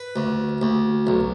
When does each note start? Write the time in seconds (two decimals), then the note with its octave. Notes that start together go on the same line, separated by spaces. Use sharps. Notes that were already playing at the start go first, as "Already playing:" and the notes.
Already playing: B4
0.16 D2
0.62 D2
1.07 B1